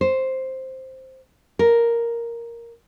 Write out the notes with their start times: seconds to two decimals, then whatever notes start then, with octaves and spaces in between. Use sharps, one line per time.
0.01 C5
1.59 A#4